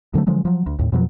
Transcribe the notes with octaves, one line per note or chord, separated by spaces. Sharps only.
G2 D3 F#3 A3
D3 F3 F#3 G#3
F3 F#3
D2
D#2 A2
F2 B2 F3 F#3